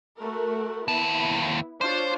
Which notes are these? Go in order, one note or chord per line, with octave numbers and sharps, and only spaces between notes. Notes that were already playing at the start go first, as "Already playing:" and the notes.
A3 F#4 A#4
D#2 B3 E4 A5
D4 F4 C5 C#5